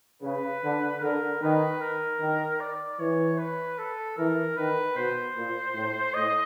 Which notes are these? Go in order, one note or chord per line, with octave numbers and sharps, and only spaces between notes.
C#3 B4
D3
D3 A#4
D#3 B4
A#4
D#3
D5
E3 C#5
B4
A4
E3 A#4
D#3 B4
B2 C5
A#2
A2
A2 D#5